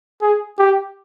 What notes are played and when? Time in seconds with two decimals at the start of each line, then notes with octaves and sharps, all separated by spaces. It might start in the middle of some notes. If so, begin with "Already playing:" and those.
0.22 G#4
0.59 G4